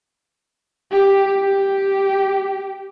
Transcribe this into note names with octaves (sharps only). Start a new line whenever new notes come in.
G4
G4